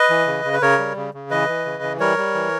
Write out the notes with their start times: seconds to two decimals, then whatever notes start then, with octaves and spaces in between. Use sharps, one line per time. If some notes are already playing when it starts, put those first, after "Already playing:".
Already playing: B4 D#5
0.10 E3
0.27 C#3
0.45 C#3
0.53 B4
0.62 C#3 A#4 C#5
0.79 G3
0.96 C#3
1.14 C#3
1.30 E3 B4 D#5
1.49 E3
1.65 C#3
1.83 E3
2.00 G3 A#4 C#5
2.18 G3
2.35 E3